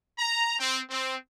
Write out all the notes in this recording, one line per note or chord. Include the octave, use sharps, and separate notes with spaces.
A#5
C4
C4